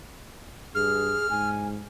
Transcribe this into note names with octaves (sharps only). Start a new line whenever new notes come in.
G2 G#4 F6
G#2 G#5